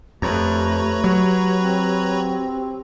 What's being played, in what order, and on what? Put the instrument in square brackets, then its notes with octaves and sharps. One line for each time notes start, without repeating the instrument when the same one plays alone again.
[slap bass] F2 [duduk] A3 [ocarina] G4 [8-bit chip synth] B4 C#5 A#5
[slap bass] F#3
[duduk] C4